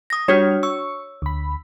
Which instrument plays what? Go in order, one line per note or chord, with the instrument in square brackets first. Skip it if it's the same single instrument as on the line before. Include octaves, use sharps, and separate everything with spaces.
[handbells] D#6 A#6
[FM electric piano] G3 F6 [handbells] D4 F#4 [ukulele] C#5
[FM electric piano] C#6 [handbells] E6
[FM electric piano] D2 B5